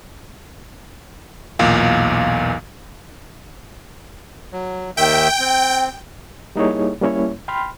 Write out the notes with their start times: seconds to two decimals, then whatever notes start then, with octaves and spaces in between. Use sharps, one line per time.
1.59 B1 E2 A#2 F5
4.52 F#3
4.97 D#2 D#3 E5 G5
5.39 C4
6.56 G3 A#3 D#4 E4 G#4 C#5
7.01 G3 A#3 C#4 E4 C#5
7.48 G5 B5 C6 F6